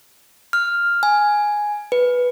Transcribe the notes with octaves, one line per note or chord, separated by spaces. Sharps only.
F6
G#5
B4